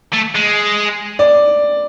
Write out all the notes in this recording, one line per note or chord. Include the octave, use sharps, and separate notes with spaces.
A3
G#3
D5